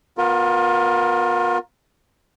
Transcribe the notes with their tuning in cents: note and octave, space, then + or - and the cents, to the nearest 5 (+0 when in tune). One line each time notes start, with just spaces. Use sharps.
B3 +0 F4 +35 A#4 +10